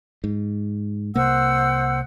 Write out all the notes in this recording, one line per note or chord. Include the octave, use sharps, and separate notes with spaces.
G#2
C2 C3 A#3 C5 F#5 E6